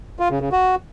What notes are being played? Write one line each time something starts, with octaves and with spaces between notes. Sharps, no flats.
F4
C#3
C#3
F#4